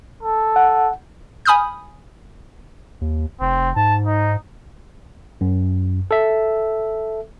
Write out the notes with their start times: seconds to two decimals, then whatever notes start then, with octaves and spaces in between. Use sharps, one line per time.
0.23 A4
0.56 F#5
1.45 G#5 B5 D#6 F6 G6
3.01 D#2
3.41 F1 C4
3.76 G#2 A5
4.06 D#4
5.41 F#2
6.11 A4 E5